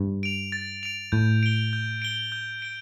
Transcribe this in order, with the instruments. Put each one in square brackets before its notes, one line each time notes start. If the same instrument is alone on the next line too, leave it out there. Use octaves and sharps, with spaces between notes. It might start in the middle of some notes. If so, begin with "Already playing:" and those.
Already playing: [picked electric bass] G2
[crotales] D7 F7
A6
D7 F7
[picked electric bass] A2 [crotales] G6
[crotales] D7 G7
G6
D7 G7
G6
D7 G7